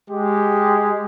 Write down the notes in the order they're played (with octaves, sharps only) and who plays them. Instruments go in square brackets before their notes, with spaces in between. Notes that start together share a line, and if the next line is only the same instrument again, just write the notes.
[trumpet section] G#3 G4